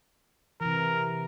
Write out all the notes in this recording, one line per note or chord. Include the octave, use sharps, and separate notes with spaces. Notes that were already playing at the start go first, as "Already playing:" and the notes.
C3 E3 A#4